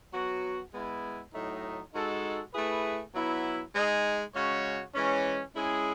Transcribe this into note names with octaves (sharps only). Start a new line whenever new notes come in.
F#3 B3 F#4
G#3 B3 E4
A2 F#3 A3 D#4
G#3 D#4 F#4 A4
A3 E4 G#4 B4
F#3 B3 E4
G#3 D#4 G#4
C#3 G#3 C#4 F#4 C#5
E3 G#3 C#4
G#3 C#4 E4 G#4